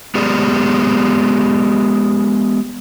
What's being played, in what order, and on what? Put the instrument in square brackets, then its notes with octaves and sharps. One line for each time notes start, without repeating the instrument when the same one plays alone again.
[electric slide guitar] G#3 B3 G4 G#4 D5